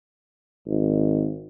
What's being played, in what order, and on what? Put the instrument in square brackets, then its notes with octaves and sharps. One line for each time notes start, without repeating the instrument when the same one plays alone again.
[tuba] G#1